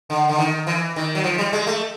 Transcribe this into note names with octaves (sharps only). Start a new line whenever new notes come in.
D3
D3
D#3
E3
D#3
F#3
F3
G3
G#3
A3